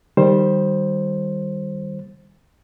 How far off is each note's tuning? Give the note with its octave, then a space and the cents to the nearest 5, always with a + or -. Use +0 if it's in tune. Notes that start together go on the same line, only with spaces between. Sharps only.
D#3 +0 G3 +0 C5 +15